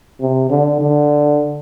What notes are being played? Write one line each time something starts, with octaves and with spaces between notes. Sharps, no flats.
C3
D3
D3